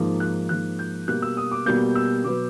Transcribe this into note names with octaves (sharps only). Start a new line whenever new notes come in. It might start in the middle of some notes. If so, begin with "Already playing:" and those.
Already playing: G#2 F3 A#3
F#6
G#2 F3 A#3 F#6
G6
B2 G3 A#3 F#6
E6
D#6
D6
B2 G3 A#3 G6
E6
B2 F#3 B3 D6